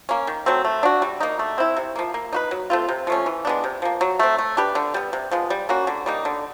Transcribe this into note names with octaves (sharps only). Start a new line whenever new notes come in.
A#3 C#4
D#3
F#3 A3 C4
A3
D4 F#4
G3
A#3 D#4
A3
C4 E4
C3
F3 A#3
A#3
D#4 F#4 B4
F#3
A3 C4 F4
C3
F3 A3 C#4
E3
G#3 B3 D4
C3
F3 A#3
F#3
A3 C4
A3
D4 G4 B4
D3
G3 B3
C3
F3 G#3 B3
G3
A#3 C#4 F#4
D3
G3 A#3 D#4
D3